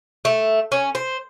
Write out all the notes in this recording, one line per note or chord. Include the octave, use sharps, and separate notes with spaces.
A3
C#4
C5